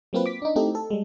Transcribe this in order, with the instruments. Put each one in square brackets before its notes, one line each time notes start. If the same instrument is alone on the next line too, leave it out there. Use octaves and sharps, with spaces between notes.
[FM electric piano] F#3 A#3 C4 F4 B4
D6 B6
D4 D#4
A3 C4 D#4 E4 G4 A4
A4
G3 G#3